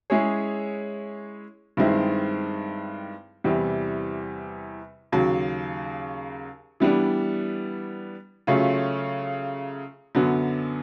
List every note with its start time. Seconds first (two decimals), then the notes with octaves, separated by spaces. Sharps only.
0.10 G#3 C#4 E4 G#4 C#5
1.77 G2 D#3 G#3 C4 E4
3.44 E2 C3 E3 G3
5.12 D#2 C#3 F#3
6.80 E3 G3 B3 D4
8.47 C#3 F#3 A3 C#4 F4
10.15 F#2 D3 F#3 B3